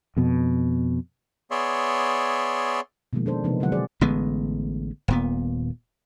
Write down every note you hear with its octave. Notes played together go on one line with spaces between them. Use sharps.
F2 B2
B3 G#4 C#5 D5 E5 C6
B2 D#3 F3 G#3 A#3
D4 A4 C5
C3 E3 F3 A#3 B3 D#4
D3 F#3 G#3 E4 F#5
G#4 C5 D5
A1 D3 G#3 B3
D#1 A#2 B3